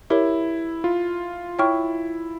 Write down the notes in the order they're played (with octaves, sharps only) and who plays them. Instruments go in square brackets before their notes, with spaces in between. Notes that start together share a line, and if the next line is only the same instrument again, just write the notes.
[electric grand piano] E4 [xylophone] G4 A#4 C#5
[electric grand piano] F4
[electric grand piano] E4 [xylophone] C#5 G5 C#6 F6